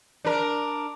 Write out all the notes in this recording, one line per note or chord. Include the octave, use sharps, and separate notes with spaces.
D4 A#4